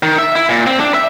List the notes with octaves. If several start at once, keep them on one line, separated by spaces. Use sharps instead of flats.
D#3
E5
E4
A#2
C4
D4
E5